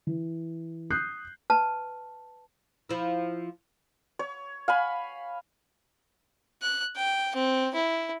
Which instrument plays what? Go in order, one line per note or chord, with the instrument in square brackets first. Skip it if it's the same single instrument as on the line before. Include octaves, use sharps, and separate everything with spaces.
[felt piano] E3
D#6 F#6 G6 C7
[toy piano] B4 A5
[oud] F3 E4
[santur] C#5
F5 G#5 B5
[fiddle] F#6
G5
C4
E4